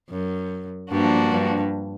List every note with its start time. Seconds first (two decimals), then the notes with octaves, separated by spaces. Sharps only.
0.10 F#2
0.90 G2 F3 A#3 D4 F#4
1.32 G2